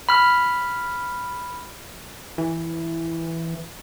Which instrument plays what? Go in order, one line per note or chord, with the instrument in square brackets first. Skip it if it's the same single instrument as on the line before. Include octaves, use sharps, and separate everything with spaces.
[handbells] B5 F6
[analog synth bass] E3